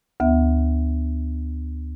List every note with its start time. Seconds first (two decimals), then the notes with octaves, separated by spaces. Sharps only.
0.20 D2 B3 E5